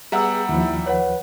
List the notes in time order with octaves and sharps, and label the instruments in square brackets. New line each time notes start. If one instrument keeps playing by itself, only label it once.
[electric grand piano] G3 E5 F#5 [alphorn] B3 [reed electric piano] G#4 [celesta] A#5 E6
[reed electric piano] D#2 F3 [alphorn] E4
[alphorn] B4 [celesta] C#5 F#5